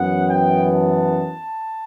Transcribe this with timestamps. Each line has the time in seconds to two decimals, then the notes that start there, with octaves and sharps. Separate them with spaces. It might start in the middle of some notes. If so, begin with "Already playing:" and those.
Already playing: F#2 E3 B3 F#5
0.29 G5
0.75 A5